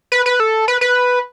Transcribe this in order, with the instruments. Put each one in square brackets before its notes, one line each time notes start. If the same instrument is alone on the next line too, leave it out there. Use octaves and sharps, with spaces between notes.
[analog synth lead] B4
B4
A4
B4
B4